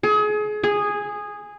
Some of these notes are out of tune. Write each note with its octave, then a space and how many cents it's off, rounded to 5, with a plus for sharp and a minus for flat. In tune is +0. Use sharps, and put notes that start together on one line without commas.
G#4 +30
G#4 -10